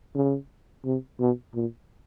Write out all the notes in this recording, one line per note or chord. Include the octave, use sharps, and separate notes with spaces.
C#3
C3
B2
A#2